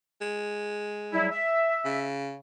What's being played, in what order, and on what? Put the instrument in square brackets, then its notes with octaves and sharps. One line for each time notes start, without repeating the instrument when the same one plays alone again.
[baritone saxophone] G#3
[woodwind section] F#3 G3 E4
E5
[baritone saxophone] C#3